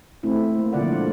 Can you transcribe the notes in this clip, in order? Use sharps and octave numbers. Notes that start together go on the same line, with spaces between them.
A3 C4 E4
A#3
B2 D3 F3 F4 D5 F#5
G#3 A#3